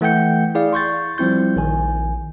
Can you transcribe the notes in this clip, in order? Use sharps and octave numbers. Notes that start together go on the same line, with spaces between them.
E3 A3 F#5 G5 G6 C#7
E4 G#4 D5 F5
C6 C#6 G6 A6
F3 G3 C4 E4 G6
A#1 D#3 G#5